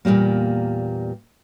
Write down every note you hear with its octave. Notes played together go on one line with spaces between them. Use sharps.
E2 A#2 E3 G3 A#3